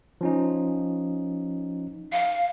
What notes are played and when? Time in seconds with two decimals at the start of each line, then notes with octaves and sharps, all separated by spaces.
0.21 F3 C#4 D#4
2.13 F5